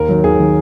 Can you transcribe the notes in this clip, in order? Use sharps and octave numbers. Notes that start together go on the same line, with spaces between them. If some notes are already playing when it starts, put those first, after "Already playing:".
Already playing: D#2 A#4
D#3 F#3
D#2 G#4
D#3 F#3